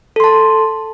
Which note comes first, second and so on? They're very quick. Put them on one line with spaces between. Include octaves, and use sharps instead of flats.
A4 C6 A5